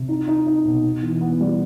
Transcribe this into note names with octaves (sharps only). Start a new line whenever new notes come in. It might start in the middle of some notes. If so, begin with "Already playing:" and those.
Already playing: C3
D#4
D#4
D#4
B2
B3
E3
B3
G3